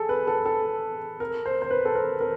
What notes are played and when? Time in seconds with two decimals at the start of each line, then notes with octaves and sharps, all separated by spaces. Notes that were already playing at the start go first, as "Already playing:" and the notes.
Already playing: G#4 A4
0.09 B4
0.27 A4
0.46 A4
1.20 A#4
1.46 C5
1.62 C5
1.71 B4
1.85 A4
1.95 A#4
2.20 A#4